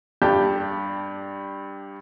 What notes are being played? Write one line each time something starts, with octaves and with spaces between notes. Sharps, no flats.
G2 G4 A5 G6